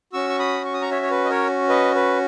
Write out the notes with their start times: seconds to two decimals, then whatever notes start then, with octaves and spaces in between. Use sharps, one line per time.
0.13 C#4 F#4 C#6 E6
0.30 C#6
0.39 B5 D#6
0.65 C#6
0.74 D#6
0.82 A#5 C#6
0.91 C#5 E5
1.02 C#5
1.11 B4
1.25 D#5
1.30 A#4 C#5
1.69 B4 D#5
1.95 B4